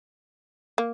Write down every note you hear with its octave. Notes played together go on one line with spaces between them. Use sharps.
A#3